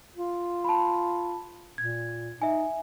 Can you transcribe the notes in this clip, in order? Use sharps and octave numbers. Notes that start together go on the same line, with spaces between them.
F4
A5 B5
A#2 G#6
D#4 E5 G#5